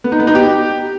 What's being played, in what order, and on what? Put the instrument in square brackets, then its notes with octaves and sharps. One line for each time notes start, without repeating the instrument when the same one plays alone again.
[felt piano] B3
D#4
B3
D#4
G4